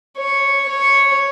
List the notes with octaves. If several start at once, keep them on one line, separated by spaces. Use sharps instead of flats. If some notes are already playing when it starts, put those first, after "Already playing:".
C#5
C#5